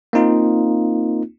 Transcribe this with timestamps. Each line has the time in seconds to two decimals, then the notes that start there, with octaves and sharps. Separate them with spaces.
0.13 A#3 C4 D#4 F4